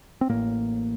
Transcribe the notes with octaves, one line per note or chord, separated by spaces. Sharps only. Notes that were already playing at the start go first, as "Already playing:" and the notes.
C4
A1 A2 A#3